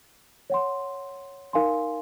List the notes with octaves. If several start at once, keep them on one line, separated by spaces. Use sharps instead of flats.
C#5 F#5 C6
D#4 A#4 F5 G#5 C6